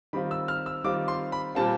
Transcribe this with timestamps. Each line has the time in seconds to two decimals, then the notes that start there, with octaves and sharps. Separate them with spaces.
0.13 D#3 G3 C4 F4 B5
0.31 E6
0.48 F6
0.66 E6
0.84 D#3 G3 C4 F4 D6
1.08 C6
1.32 B5
1.55 A#2 G3 C4 F4 A5